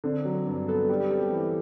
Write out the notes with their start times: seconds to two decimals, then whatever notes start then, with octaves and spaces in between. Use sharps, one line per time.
0.04 D3 C4
0.25 F#3
0.46 G2 D4
0.68 B3 A4
0.89 G3 G4
1.00 G4
1.10 C4 A4
1.21 G4
1.32 E3